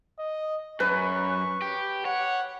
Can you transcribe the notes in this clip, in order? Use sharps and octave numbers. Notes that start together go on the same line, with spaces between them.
D#5
F#2 B4 C#6
G4
C#5 F#5